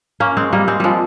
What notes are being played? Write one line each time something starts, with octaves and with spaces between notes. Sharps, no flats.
A#3 C#4
G#3 C4
G3 A#3
G#3 C4
F3 G3 G#3